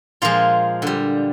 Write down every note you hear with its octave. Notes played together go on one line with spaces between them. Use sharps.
A#2 F3 G#3 F4 F5
D3 G3